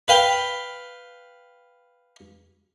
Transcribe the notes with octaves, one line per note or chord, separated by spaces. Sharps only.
B4 F5 G5